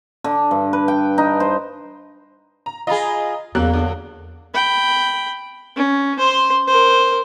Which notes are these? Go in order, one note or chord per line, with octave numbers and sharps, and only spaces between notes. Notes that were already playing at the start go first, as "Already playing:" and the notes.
D3
G2
B4
G5
D#4
C5
A#5
F4 G#4 D#5 A#5 B5
E2 C#3 F#3 A#3 F#6
D3
G5 B5
C#4
C5 C6
A#4 C5